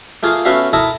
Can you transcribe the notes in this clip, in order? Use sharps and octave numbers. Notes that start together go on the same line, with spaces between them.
A3 A#3 F4 G#4
A3 B3 C#4 F#4 E5 F5
E4 A4 A#4 E5 A5 D#6